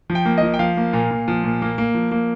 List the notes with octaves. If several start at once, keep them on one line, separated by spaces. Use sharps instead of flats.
F3
G5
A#3
F3 D#5
G5
F3 F5
A#3
A#2
A#2
F3
A#2
A#3
A#3
F3
A#3